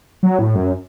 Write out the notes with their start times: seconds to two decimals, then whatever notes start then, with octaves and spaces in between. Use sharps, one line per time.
0.23 F#3
0.39 A2
0.55 F#2